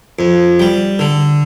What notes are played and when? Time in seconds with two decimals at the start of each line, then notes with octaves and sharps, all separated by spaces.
0.19 F2
0.60 G3
0.99 D3